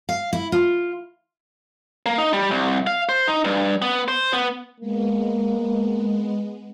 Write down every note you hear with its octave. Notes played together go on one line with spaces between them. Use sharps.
F5
E4
F4
A#3
D#4
G3
C2
F5
C5
D#4
G2
B3
C5
B3
G#3 A#3 B3